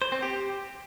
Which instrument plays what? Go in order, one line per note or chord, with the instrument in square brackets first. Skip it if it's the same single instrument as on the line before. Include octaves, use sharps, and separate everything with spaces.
[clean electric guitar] C5
C4
G4